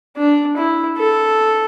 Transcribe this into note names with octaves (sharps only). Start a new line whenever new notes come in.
D4
E4
A4